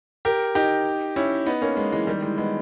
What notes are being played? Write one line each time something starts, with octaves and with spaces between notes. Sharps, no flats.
G4 A#4
D#4 G4
C#4 E4
B3 D#4
A#3 C#4
G#3 B3
E3 G#3
D#3 G3
E3 G#3
G#3 B3